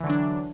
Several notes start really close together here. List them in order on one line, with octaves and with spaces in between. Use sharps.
E3 D3 F#3 D4